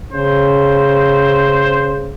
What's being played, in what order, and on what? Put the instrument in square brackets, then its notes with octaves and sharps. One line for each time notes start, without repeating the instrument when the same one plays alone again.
[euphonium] C#3 [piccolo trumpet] C5